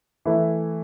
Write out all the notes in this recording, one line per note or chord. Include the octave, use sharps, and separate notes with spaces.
E3 A3 E4